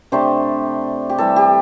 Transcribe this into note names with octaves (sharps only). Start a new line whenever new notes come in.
C3 A3 D4 G4 C5
G4
E3 G3 E4 A4
G4